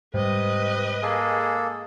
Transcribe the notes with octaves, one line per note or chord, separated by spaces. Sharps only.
G#2 C3 G3 B4 D#5
G#3 A#3 G#4 A4